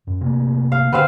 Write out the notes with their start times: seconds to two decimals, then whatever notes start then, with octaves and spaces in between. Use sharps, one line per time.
0.07 F#2
0.21 C3 A3 A#3
0.72 F5
0.92 D3 B3 C4 F5